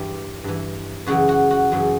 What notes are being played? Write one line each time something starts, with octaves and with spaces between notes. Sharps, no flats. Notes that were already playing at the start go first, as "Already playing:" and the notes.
Already playing: G2 E3 G4
G2 E3
F#2 C#3 E3 F#4
F#4
F#4
F#2 C#3 E3